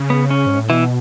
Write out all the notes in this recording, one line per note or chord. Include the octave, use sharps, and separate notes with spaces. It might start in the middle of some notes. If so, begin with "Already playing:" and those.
Already playing: C#3
B3
C#4
G#2
A2
B2 E3 E4